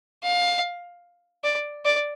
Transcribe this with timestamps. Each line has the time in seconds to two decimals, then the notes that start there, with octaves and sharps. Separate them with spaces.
0.23 F5
1.44 D5
1.85 D5